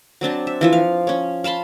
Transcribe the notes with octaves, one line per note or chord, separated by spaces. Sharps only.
F#3 C4 D4 A5
E5
E3 F3 E5
F5
C#4 C#5
F5 A5 B5 C6